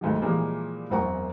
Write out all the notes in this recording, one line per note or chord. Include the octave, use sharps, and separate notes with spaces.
D2 G#2 D#3 F#3
A#2 E3 F3 G3 G#3 A#3
E1 F#2 C4 F#5 A#5 C#6